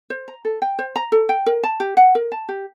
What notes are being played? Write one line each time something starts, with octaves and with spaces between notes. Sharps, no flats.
C5
A#5
A4
G5
C5
A#5
A4
G5
A#4
A5
G4
F#5
A#4
A5
G4